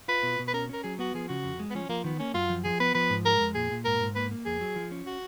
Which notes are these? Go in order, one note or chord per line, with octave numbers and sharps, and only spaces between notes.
F4 B4
B2
B2
B4
C#4 A#4
C#4 A#4
F#3 G#4
B3 F#4
F3 G#4
C#3 F#4
F2
G#3
B3
F3 C#4
F3 A#3
D#3 B3
A#3 C#4
F#2 F4
F3
F3 G#4
B3 B4
F3 B4
G#2
G#3 A#4
F2
A#2 G#4
A#2
G#2 A#4
G#2
A#3 B4
A#3
F2 G#4
F#3
F3
C#4
F#4